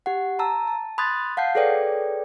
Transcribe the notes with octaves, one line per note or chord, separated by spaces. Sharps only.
G4 F#5
A5 A#5 E6
A5
B5 C6 D#6 F#6 G#6 A6
F5 F#5 A5 G6 C7
G#4 A4 B4 C#5 D5 G5